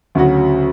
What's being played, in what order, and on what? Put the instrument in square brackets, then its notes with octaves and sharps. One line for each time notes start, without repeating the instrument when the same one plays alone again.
[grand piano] D2 C#3 F#3 C#4 F#4